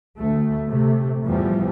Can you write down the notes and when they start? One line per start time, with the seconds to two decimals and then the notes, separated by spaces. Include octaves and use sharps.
0.16 D2 A3
0.69 C3 A3
1.24 E2 A2 E3 F3 G3